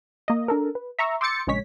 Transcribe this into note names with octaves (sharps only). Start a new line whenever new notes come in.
A#3 D#5
D4 A4 A#4
B4
E5 A#5 C#6 E6
C6 D6 E6 G6 A6 C#7
A#1 C#3 G#3 C#5 B6